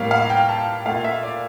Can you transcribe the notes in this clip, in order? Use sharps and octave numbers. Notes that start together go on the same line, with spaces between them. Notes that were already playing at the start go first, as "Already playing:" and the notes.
Already playing: A2 G3 A#3 C#5 F5
F5
G5
A5
A#2 A3 F5
E5
D5